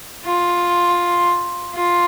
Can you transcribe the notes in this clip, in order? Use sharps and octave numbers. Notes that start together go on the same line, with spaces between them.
F4
F4